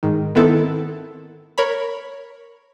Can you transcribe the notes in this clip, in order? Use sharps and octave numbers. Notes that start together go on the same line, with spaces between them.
G#2 D#3
D#3 B3 C4 E4 A4
A#4 C#5 B5